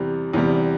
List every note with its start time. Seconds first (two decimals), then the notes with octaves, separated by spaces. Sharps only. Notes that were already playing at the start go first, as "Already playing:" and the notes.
Already playing: E2 C3 G3
0.33 E2 C3 G3